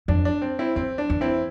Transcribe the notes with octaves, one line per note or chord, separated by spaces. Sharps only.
F2 D4
D4
C4
C4 E4
E2 C4
D4
E2
C4 E4